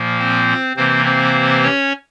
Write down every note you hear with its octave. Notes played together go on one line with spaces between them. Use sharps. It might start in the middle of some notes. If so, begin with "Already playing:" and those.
Already playing: A#2 F3 A#3
C4 C5
C3 E3 A#3 C4 C5
C4 C5
C#4 C#5